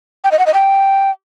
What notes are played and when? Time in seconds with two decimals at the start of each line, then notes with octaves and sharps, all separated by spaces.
0.24 G5
0.32 D#5
0.39 F#5
0.47 D#5
0.54 G5